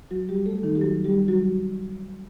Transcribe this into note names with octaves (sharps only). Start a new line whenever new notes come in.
F#3 F#4
G3 G4
A3 A4
D#3 D#4
G4
F#3 F#4
G3 G4
F#3 F#4